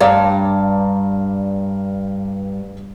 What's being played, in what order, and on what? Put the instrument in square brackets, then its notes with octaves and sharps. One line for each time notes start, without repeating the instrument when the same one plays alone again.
[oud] G2 [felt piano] D5 F5 A#5